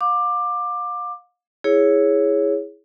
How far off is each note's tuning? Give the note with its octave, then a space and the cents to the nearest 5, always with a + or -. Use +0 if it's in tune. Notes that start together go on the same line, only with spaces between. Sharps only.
F5 +40 D6 +15
E4 -5 G#4 +0 C#5 +0